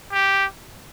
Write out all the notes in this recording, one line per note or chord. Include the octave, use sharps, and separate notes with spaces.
G4